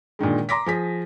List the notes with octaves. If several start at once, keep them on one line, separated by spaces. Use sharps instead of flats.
A#2 D3 D#3 G#3
A#5 C6 D6 A#6 B6
F3 G#4 B6